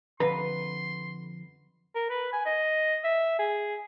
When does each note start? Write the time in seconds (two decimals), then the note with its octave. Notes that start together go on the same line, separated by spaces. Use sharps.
0.20 F2 D3 B4 A#5 C6
1.95 A#4
2.10 B4
2.33 G#5
2.45 D#5
3.04 E5
3.39 G#4